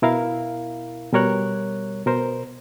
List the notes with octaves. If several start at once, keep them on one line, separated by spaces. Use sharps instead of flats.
B2 E4 A#4 F5
B2 G3 A#4 C#5 F#6
B2 A#4 C5